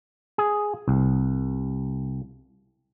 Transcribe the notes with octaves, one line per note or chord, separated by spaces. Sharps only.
G#4
C2